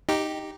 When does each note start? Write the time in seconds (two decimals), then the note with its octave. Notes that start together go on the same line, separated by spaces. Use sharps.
0.09 D#4 G4